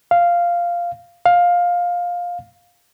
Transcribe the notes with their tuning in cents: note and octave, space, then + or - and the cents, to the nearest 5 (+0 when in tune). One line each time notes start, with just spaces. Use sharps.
F5 -5
F5 +15